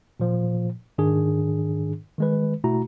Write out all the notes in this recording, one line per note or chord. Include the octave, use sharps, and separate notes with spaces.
A#2 F3
G#2 D#3 D4 G#4
D#3 G#3 B4
B2 A3 E4 F#4 A#5